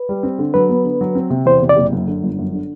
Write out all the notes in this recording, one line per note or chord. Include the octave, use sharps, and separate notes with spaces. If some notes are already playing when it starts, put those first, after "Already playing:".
Already playing: B4
G3
C4
D3
F#3 B4
B3
D3
F#3
C4
C3
E2 C5
C3
D5
F#1
F#2
D3
G1
F#2
D3